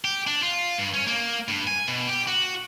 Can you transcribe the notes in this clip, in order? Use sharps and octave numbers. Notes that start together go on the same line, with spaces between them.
G4
D4
F4
G2
C#4
A#3
G2
G#5
B2
G4
F#4